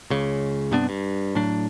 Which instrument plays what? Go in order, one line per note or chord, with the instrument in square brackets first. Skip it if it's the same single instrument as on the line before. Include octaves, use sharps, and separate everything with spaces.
[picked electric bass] C#2 C#3
G2 C3 B3 D4
G2
A2 F#3 D4